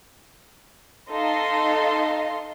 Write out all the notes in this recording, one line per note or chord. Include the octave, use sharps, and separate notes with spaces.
D#4 A4 D#5 F5 C6